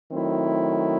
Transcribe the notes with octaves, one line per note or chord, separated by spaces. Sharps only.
D#3 F#3 A3 C4 E4